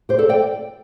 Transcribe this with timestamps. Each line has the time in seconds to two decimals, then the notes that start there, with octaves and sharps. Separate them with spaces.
0.09 G4 C5
0.19 A4 D5
0.29 D5 G5